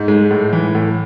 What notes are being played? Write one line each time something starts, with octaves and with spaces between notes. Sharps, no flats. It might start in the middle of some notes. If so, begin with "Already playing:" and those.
Already playing: G#2
G#3
A2
E3
A2